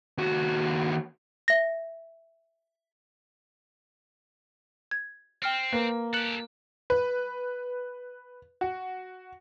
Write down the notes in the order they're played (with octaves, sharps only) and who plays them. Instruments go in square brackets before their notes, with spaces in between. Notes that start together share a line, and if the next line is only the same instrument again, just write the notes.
[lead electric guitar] D#2 F#4
[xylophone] E5 A#6
G#6
[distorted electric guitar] C4 [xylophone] G5 F6 C#7
[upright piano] A#3 [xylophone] B4
[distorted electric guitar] G4 A4 [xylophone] F#6 C#7 F#7
[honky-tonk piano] B4
F#4